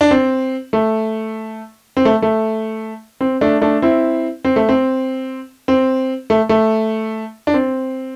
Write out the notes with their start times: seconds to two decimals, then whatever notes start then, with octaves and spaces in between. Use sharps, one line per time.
0.01 D4
0.11 C4
0.73 A3
1.97 C4
2.05 A3
2.22 A3
3.21 C4
3.41 A3 D4
3.61 A3 D4
3.82 C4 E4
4.45 C4
4.56 A3
4.69 C4
5.68 C4
6.30 A3
6.49 A3
7.47 D4
7.54 C4